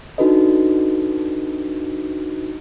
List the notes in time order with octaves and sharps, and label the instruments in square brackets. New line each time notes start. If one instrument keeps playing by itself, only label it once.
[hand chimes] D4 D#4 F#4 A4 B4 D#5